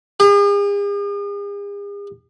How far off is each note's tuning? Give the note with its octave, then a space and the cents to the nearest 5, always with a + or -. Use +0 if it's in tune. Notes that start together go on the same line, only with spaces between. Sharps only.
G#4 -45